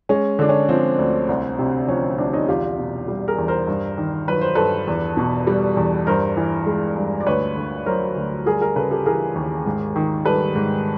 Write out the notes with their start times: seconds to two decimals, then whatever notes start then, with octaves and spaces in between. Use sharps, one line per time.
0.09 G#3 C#4
0.39 D3 D4
0.49 C#4
0.69 F3 C4
0.99 D2
1.29 C2
1.59 C3
1.88 F3 C#4
2.18 C2 C4 D4
2.33 C#4 D#4
2.48 E2 F4 G4
2.79 B2
3.08 G3
3.28 G#4 A#4
3.38 E2
3.48 A#4 C5
3.67 G2
3.98 D#3
4.28 F#3 B4
4.41 C5
4.55 G2 A4 B4
4.87 E2
5.17 B2
5.47 G3
5.77 E2
6.07 G2 A#4 C5
6.37 E3
6.66 G#3
6.97 G2
7.21 D5
7.27 D2 B4 C#5
7.56 D3
7.86 F#3 A#4 C5
8.16 D2
8.46 G3 G#4 A#4
8.61 G#4 A#4
8.75 C#3 A4 B4
8.91 G4 A4
9.06 E3 G#4 A#4
9.35 D#2
9.66 G#2
9.96 D#3
10.25 G3 A4 B4
10.55 G#2